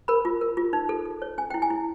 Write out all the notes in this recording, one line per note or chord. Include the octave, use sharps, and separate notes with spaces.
A#4 B5
F4
A#4
F4
D#4
A4
A4
C#5
C#4 G#5
E4 G5
G#5
E4